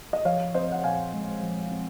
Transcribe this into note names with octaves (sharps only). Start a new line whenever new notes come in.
D#5
F3 C#5 F5
C4 C5 D#5
F#5
A#2 F5 G#5
G#3
F3
C4